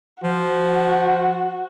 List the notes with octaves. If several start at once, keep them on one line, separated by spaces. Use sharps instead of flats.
F3 F#4